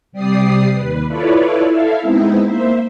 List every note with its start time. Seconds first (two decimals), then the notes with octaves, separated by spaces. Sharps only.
0.12 C3 G3 G4 D5 D#6 C7
0.72 D#2 B4
1.07 E4 F4 A4 B4 C#5 D5
1.65 E4 A4 E5 F5
2.01 G#3 B3 C4 D#4 E4
2.42 A#3 C5 E5